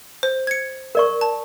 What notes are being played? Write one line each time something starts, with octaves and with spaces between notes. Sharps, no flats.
C5
G#6 C#7
A#4 D5 C#6
A5